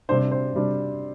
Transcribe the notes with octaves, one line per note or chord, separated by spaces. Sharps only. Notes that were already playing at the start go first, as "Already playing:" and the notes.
C3 G3 D4 C5
C5
C3 G3 D4